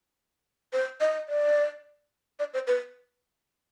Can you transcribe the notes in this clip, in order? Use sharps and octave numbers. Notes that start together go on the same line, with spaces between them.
C5
D#5
D5
D5
C5
B4